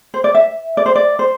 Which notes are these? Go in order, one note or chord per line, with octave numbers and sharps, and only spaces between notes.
C5
D5
E5
D5
C5
D5
C5